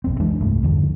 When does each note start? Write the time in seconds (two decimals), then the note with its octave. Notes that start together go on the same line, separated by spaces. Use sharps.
0.04 B1 F2 C4
0.20 F2 E3 G#3 D4
0.41 C2 G2 A3
0.63 E2 G2 D3 F3